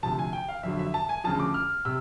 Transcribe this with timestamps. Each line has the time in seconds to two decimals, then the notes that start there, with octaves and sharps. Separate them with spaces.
0.03 D2 C3 F3 A5
0.19 G#5
0.33 G5
0.48 F5
0.63 F2 D3 F#3 E5
0.79 E5
0.94 A5
1.09 G#5
1.24 D2 C#3 F3 A5
1.39 D6
1.54 F6
1.85 C3 E6